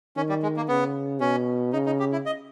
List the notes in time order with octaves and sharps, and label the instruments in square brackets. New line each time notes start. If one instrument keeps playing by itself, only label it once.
[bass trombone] D#3 [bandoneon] C#4
[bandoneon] G3
G#3
A#3
[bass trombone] C#3 [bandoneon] B3
[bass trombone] B2 [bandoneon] C#4
[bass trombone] C#3 [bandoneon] D#4
[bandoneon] D#4
G4
E4
D#5